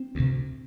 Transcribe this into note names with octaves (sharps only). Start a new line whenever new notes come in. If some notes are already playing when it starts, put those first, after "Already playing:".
Already playing: C4
D2 C3